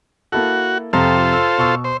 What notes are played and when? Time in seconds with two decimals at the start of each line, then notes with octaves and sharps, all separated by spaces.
0.32 A#3 E4 F#4 A4
0.93 F2 C3 F4 A4 C5 A#5
1.33 E6
1.58 B2 C#6 E6
1.84 C5